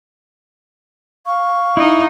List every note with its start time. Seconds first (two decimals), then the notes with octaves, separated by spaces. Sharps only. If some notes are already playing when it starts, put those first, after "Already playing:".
1.26 F5 C#6
1.77 D#4 E4